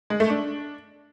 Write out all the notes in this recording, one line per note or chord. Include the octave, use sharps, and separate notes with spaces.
G#3
A3
D4